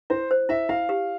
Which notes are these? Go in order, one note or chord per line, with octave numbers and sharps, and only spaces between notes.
E4 C5
C5
E4 E5
E4 F5
G4